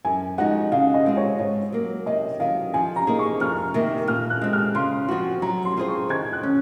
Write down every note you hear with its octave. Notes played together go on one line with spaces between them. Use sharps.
F#2 G#5
F3 G#3 D#4 F#4 F#5
C#3 F5
D#5
G#3 C4 F4 G#4
C#5
G#2 C#5
F#3 A#3
C3 D#5
D#3 F#3 F5
F3 G#5
A#5
A#3 D#4 G#4 C5
C#6
F2 F6
C3 D#3 A#3
A#2 F6
F#6
G#3 C4
F6
C#3 C6
F3 C4 F#4
F#3 A#5
C6
C4 F4 G#4 C5
C#6
D#3 G#6
F#6
C#4